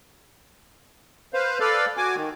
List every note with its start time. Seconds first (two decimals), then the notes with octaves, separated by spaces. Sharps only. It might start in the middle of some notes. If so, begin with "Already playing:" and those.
1.34 B4 C5 F5
1.60 A4 B4 D5 F5
1.97 F#4 G#5 D6
2.15 D#3